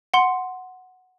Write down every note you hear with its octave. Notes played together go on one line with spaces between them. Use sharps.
F#5 C6